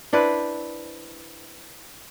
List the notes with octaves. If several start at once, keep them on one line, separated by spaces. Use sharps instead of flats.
D4 E4 B4 C5